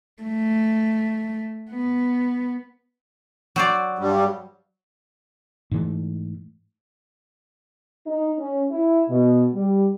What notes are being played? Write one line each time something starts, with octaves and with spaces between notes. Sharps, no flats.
A3
B3
F#3 C5 D5
G2 G3
G#2 E3 A3
D#4
C#4
E4
B2
G3